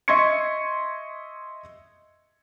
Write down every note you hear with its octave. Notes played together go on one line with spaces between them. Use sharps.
D#5 E5 C6 C#6 G#6 C#7